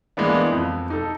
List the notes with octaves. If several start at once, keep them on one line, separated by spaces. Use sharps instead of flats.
E3 G#3 A#3 B3 D4
F2
D#4 A4